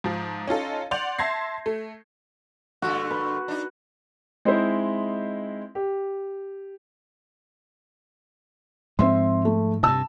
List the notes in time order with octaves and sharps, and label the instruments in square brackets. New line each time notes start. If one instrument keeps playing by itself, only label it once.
[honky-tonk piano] G#2 F3
C#4 D#4 F4 A4
D5 F#5 C6 G6 F7
E5 A5 C6 G#6 A#6 C7
A3
[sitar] G2 D3 A3 [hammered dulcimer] F#4
[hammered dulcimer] B4
[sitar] D4 D#4
[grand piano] G#3 C4 D#4 E4 C5 E5
G4
[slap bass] G#2 F3 G#3 [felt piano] C4 E5 C6
[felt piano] A3
[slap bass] G2 C3 [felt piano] A5 E6